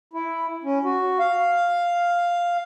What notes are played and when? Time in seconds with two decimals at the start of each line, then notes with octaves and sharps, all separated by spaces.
0.13 E4
0.64 C#4
0.84 F#4
1.20 F5